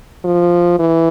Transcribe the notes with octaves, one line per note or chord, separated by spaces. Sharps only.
F3
E3